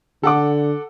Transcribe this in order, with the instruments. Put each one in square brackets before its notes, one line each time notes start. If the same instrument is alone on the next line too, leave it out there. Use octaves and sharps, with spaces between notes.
[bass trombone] D3 [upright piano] A4 F#5 D6